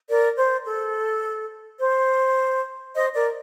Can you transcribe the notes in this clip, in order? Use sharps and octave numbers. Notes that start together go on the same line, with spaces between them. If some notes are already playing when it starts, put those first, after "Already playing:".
A#4 D5
C5
A4
C5
C5 D#5
A#4 D5